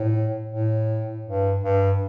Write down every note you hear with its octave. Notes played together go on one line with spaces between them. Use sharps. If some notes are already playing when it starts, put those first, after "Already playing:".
Already playing: A2
A2
G2
G2